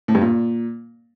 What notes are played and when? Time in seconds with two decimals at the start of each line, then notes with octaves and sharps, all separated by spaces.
0.08 A2
0.15 G2
0.21 A#2